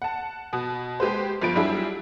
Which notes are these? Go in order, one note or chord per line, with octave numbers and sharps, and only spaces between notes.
F#5 A5
B2
G#3 G4 B4 C5
G1 F3 D7
F#3 G3 D4 E4 G#4